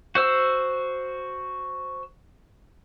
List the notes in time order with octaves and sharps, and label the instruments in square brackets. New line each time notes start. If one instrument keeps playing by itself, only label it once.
[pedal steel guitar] F#4 C5 E6